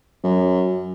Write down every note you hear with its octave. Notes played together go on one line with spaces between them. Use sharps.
F#2